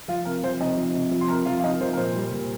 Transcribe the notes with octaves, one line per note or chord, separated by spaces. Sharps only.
F3 F4 F5
C3 A#4
F3 C5
C3 D#4 D#5
F3
C3
F3
C6
C3 A#4 A#5
F3 F4 F5
F5
C3 D#4 D#5
A#4
F3 C5
A#4
A#2 C5
G3
A#2